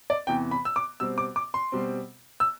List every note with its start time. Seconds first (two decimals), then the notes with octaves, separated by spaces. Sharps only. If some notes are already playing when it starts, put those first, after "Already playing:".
0.10 D5
0.27 E2 C3 E3 G5
0.51 B5
0.65 E6
0.76 D6
1.00 B2 G3 C4 E6
1.18 D6
1.36 D6
1.54 C6
1.72 B2 G3 C4
2.40 E6